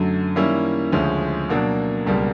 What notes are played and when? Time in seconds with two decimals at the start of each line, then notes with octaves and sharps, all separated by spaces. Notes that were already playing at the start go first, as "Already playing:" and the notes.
Already playing: F#2 D3 F#3 A3
0.36 D#3 G3 A#3 C#4 E4
0.92 D2 C#3 F3 G#3 C#4
1.50 B2 F#3 A#3 D4
2.06 C#2 B2 G3 A#3